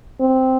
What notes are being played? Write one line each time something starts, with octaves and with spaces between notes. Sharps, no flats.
C4